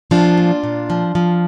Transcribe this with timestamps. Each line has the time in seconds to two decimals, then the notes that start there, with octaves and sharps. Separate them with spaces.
0.11 F3 D4 F4
0.37 A#2
0.63 A#2
0.90 F3
1.15 F3